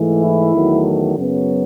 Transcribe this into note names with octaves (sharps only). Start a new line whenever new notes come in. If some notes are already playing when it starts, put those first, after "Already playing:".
Already playing: G#2 E3 A3
E4
E2 D#3 F#3 A3
F#2 C#3 F#3 B3